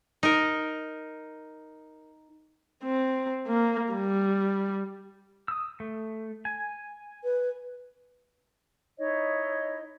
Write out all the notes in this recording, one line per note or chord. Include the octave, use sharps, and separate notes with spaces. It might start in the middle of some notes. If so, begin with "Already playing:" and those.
D#4 A#4
C4
A#3
G3
D#6 E6
A3
G#5
B4
D#4 E4 C#5 D#5